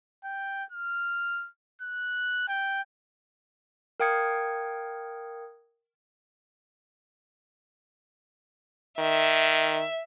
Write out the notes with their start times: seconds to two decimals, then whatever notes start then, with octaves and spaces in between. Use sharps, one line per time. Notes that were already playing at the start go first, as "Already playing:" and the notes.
0.25 G5
0.72 F6
1.82 F#6
2.49 G5
4.00 A#4 F5 G5 D#6 G#6 C#7
8.99 D#3 E5